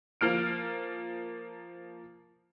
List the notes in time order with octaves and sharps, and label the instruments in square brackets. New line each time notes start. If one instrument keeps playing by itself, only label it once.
[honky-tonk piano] F3 A#3 F6 D7